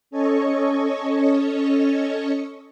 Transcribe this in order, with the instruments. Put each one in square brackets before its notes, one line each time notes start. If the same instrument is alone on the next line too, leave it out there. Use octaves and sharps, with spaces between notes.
[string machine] C#4 A4 C#5 D#5 C#6